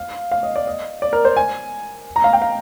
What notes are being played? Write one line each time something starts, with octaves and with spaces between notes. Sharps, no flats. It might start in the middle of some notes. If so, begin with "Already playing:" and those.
Already playing: F5
F5
D#5
D5
D#5
D5
A#4
C5
G#5
A#5
F5
G5
F5